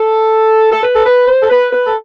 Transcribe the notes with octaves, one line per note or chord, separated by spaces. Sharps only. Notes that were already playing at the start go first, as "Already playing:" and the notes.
Already playing: A4
A4
B4
A4
B4
C5
A4
B4
B4
A4